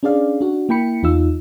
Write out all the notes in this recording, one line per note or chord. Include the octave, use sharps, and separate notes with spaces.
C#4 D4 G#4 D5 F5
D4 F#4
A#3 E4 G5 B5 C#7
E2 D#4 F4 E6